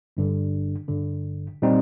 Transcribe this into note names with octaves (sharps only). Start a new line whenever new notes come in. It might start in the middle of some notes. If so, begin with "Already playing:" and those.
G1 G2 D3
G1 G2 D3
A#2 G3 C4 D#4